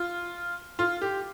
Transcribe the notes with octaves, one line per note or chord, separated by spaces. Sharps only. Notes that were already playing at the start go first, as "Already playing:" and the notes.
Already playing: F4
F4
G4